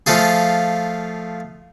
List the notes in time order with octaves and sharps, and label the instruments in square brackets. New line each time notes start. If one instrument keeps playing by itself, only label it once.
[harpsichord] F3 A3 F4 G#4